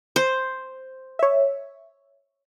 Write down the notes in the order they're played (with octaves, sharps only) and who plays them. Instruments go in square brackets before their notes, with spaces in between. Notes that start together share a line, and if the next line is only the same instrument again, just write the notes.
[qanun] C5
[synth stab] C#5 E5